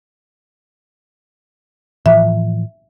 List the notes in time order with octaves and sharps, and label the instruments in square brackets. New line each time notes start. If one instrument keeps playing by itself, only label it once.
[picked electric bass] A2 E3 F3 [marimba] E5